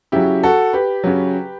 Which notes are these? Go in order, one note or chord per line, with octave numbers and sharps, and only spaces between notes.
C#3 F#3 E4 G4
F#4 A4
G4 B4
C#3 F#3